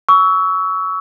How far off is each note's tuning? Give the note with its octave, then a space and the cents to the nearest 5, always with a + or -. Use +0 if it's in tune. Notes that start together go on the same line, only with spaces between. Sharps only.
C#6 +25 E6 -15